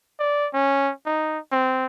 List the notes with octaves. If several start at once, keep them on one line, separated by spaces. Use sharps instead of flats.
D5
C#4
D#4
C4